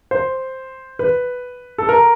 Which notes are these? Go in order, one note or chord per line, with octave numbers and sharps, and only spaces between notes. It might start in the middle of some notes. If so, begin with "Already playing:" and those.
C5
B4
A4
A#4